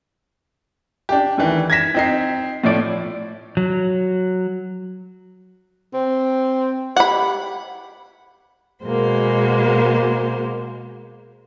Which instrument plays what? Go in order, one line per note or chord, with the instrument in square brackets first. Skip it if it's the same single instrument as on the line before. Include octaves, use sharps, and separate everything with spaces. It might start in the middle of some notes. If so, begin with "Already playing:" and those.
[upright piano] D4 G4
D2 D#3 E3
G#6 A#6 B6 E7
C4 D#4 C7
A2 F3 C#5 D5 D7
[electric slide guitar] F#3
[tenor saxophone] C4
[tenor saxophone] G4 [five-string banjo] F#5 B5
[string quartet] B2 G#3 A#3 C5